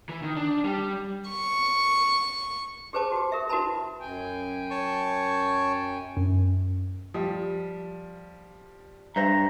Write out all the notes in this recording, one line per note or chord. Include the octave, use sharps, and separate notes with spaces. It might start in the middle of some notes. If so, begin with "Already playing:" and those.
E3
D#3
D4
G3
C#6
G4 G#4 B4 C5 A5 D6
F#4 G4
A#4 E5
E4 F#4 A#4 B4 A5 B5
F#2 G5 G#5
C#5 A5 C#6
F#2
F3 G3
G2 C5 E5 A#5